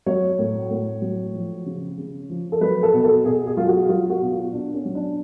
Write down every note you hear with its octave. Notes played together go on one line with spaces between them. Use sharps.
F#3 C#5
A2
A2
F#3
F3
C#3
C#3
F3
A4
F#3 B4
A4
B2
A4
B2 G#4
G#4
F#3 F4
F#4
F#3 F4
F#4
B2
F4
B2 D4
C#4
F#3
D4